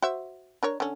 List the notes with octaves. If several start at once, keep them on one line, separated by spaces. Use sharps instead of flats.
F#4 C5 E5
D4 A#4 C#5
D3 C#4